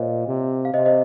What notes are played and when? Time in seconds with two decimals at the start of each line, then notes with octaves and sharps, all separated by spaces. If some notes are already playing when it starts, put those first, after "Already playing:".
Already playing: A#2 C5 C#5 D#5 F5
0.27 C3
0.65 F5
0.74 C3 C5 D#5
0.85 C5 D#5